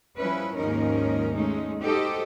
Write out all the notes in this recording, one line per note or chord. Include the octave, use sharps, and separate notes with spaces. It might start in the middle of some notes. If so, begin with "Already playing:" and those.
F3 G3 C#4 E4 B4
D#2 G#2 F3 C#4 D#4 A#4
G#3 A3 C#4 D#4
D#4 F#4 G4 A4 C5 D#5